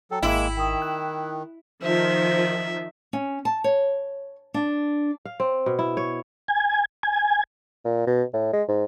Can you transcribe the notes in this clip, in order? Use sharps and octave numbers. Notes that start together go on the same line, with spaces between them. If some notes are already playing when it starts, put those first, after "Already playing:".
F#3 A4 G5
G#1 G#3 A#3 E4
D#3 G5 D#6
F#6
D#3 F3 C5 E5
C#4
A5
C#5
D4
F5
C4
B2
E4
C#5
G#5
G#5
A#2
B2
A2
G#3
G#2